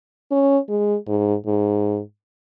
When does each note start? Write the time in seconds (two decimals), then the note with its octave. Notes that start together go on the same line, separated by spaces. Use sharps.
0.31 C#4
0.69 G#3
1.08 G#2
1.46 G#2